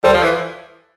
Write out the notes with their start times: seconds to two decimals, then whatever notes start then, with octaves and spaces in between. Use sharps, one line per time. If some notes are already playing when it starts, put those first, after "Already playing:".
0.04 G3 A4 C5
0.14 F3
0.23 E3